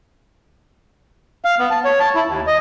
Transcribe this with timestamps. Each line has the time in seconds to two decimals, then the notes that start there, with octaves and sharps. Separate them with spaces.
1.45 F5
1.59 B3
1.70 A5
1.84 C#5
2.00 A5
2.15 E4
2.28 D#2
2.47 D#5